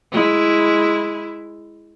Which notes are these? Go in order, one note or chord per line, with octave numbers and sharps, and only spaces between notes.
G#3 E4